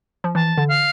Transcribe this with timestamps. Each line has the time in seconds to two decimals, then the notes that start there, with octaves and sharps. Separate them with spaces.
0.24 F3
0.35 E3 A5
0.58 D3
0.68 F5